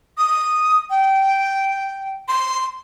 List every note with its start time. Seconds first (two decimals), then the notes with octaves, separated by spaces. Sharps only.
0.18 D#6
0.90 G5
2.28 C6